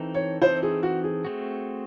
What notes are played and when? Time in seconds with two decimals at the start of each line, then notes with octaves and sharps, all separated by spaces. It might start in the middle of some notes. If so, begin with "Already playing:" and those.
Already playing: E3 C4 D#4 A4
0.14 C#5
0.42 E3 C4 D#4 A4 C5
0.63 G#4
0.83 F#4
1.04 G#4
1.25 A3 C4 F#4